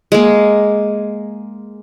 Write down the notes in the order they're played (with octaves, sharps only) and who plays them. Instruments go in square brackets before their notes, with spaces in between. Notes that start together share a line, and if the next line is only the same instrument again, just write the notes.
[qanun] G#3 A#3